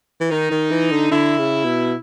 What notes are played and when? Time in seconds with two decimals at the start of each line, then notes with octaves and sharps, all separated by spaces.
0.21 E3
0.30 D#3 D#4
0.51 D#3
0.71 E3
0.91 D3
1.12 D3 E4
1.39 C#3
1.65 B2